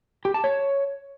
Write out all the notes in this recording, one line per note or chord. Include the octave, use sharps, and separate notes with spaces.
G4
A5
C#5